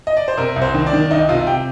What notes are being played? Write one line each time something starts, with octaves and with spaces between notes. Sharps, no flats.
D#5
D5
C5
C3 A#4
C2
C5
D#3
D4 D5
D#3
C2 D#4 D#5
C3 F4 F5
G4 G5